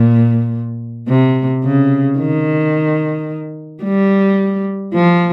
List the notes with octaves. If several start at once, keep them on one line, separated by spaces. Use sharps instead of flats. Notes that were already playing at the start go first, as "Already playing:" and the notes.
Already playing: A#2
C3
C#3
D#3
G3
F3